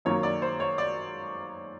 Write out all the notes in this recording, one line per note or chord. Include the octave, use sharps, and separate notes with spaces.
F#2 D#3 F#3 A#3 C#5
D5
C5
C#5
D5